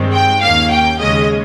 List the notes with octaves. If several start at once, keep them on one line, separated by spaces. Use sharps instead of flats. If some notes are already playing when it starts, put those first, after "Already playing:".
Already playing: G2 D#3 G#3 C4
G5
D#2 D#3 A#3 C#4 F5
G5
D#2 C#3 G#3 C#4 D#5